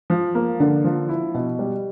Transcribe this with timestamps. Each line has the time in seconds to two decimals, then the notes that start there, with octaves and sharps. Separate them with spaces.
0.10 F3
0.35 A#3
0.60 D3
0.84 F3
1.09 E4
1.34 B2
1.59 G3